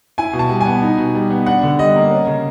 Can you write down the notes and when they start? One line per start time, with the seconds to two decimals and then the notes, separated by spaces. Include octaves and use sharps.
0.18 E4 G#5
0.33 B2
0.39 A5
0.49 G3
0.61 G#5
0.66 B3
0.82 D#4
0.98 B2
1.15 G3
1.30 B3
1.46 D4 F#5
1.63 D3
1.79 G3 D#5
1.96 A#3
2.11 C#4
2.27 C#3